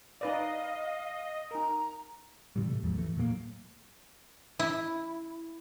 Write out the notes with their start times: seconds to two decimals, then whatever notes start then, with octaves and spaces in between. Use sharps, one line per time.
0.21 D#4 B4 D5 D#5 F5
1.51 D#4 A#4 A#5
2.56 A2 C3 E3 G3
2.69 A3
2.83 D#2 G#2 F3
2.98 E3 A3
3.17 A#2 F#3 G#3 A#3
4.59 E4